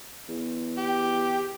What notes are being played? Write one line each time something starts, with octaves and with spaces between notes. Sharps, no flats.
E2
G4